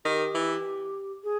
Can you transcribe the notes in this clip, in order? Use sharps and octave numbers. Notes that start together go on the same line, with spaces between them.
D#3 G4
E3
G#4